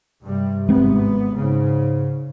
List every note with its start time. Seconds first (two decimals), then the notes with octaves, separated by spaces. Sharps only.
0.23 G2 C3 G3
0.69 G#1 G#3 B3 C4
1.37 G#2 C#3